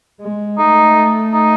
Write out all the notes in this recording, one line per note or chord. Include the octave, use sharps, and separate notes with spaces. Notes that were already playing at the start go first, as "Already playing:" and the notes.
G#3
A3 D#4
D#4